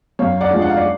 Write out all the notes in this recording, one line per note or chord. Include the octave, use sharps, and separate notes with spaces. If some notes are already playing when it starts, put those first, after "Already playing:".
F#2 C#5 F5
D5 F#5
F3 G#3 D4
F#5
F5
D5